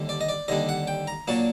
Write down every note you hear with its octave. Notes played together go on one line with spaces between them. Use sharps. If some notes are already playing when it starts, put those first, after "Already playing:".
Already playing: D#2 D3 G3 D4
D5
D#5
D5
D#2 D3 G3 D4 D#5
F#5
G5
A#5
A#2 F#3 A#3 D4 A5